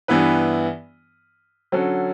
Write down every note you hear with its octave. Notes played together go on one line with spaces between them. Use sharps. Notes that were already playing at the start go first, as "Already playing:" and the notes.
G2 E3 B3 E4 B4
D3 F#3 C#4 F#4 A4